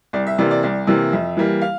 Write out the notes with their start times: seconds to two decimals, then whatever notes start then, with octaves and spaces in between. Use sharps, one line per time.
0.13 C2 D5
0.27 E5
0.38 C3 E3 A#3 D5
0.51 D5
0.63 C2 D5
0.87 C3 E3 A#3
1.12 F2 E5
1.37 E3 G3 A#3
1.61 F5